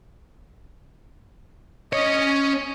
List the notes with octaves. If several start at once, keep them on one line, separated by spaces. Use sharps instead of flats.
C#4 C#5 D#5